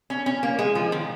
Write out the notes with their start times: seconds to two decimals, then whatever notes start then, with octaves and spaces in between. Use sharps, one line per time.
0.10 C#4
0.26 C#4
0.43 A#3
0.59 G#3
0.75 F3
0.92 D#3